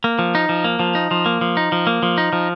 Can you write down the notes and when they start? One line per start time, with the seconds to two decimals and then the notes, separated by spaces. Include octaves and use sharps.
0.04 A#3
0.19 F3
0.35 D#4
0.49 F3
0.64 A#3
0.80 F3
0.95 D#4
1.11 F3
1.26 A#3
1.41 F3
1.57 D#4
1.72 F3
1.87 A#3
2.03 F3
2.18 D#4
2.33 F3